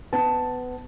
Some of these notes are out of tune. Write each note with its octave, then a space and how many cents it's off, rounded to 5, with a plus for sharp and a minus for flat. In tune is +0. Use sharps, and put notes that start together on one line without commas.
B3 +20 A5 +0